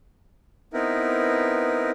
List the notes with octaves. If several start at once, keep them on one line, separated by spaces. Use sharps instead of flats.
B3 C4 D#4 E4 A#4 B4